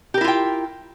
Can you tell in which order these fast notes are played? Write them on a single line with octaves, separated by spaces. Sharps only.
G4 A#4 E4 F4 G5